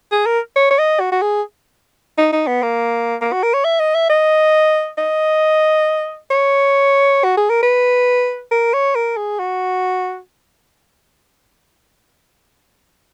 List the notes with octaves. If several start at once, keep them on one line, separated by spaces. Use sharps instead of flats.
G#4
A#4
C#5
C#5
D#5
F#4
F#4
G#4
D#4
D#4
B3
A#3
A#3
F#4
A#4
C#5
E5
D#5
E5
D#5
D#5
C#5
F#4
G#4
A#4
B4
A#4
C#5
A#4
G#4
F#4